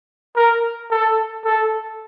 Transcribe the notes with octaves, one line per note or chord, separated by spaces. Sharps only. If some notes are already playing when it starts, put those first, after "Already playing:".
A#4
A4
A4